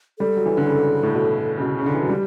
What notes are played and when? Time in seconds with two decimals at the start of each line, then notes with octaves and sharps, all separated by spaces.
0.19 G3 A4
0.36 F#3
0.46 E3
0.57 D3
0.66 C#3
1.03 A2
1.15 B2
1.57 C#3
1.61 B2
1.79 C#3
1.86 D3
1.94 E3
2.02 F#3
2.09 G3 G4